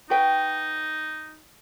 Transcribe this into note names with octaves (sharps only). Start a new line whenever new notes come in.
D#4 F#4 B4 G5